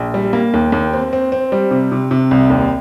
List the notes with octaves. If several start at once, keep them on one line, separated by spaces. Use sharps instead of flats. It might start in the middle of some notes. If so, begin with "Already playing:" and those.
Already playing: A#1
G3
A#3
D#2
D#2
C4
C4
C4
G3
C3
C3
C3
C2
D#2